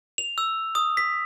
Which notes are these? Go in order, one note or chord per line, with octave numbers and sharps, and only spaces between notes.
F7
E6
D#6
B6